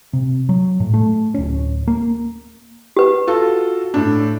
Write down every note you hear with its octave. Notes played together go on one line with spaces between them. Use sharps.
C3
F#3
A2
A3
D1 C#4
A#3
G4 B4
F4 F#4 A4
A2 D4